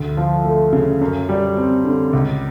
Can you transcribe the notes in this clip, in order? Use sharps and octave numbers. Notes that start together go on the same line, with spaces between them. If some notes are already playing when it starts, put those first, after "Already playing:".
Already playing: D2
F3
A3
C#3
F#2
G3
C4
D3
C#2